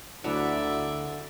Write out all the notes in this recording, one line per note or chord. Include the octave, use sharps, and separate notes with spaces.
D2 D3 F#3 D4 E4 D5 E5 F#5